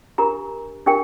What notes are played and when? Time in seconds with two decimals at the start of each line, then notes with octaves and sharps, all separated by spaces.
0.18 D4 G4 A#4 A#5
0.86 D4 G4 A#4 G5